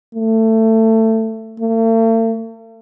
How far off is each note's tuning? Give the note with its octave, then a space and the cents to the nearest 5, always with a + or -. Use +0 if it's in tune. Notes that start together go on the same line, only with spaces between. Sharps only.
A3 +20
A3 +45